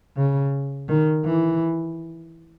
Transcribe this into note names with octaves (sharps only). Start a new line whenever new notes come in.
C#3
D#3
E3